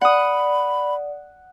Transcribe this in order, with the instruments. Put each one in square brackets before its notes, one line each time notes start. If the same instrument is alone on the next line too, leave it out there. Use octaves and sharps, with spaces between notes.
[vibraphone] D5 [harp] F#5 D#6 [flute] B5